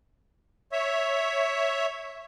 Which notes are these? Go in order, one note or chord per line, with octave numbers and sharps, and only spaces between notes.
C#5 E5